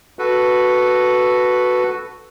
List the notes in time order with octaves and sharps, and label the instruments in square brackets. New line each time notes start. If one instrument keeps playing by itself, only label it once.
[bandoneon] F#4 A4 B4